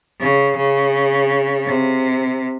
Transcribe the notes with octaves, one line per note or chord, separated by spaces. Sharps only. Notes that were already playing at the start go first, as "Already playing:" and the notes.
C#3
C#3
C3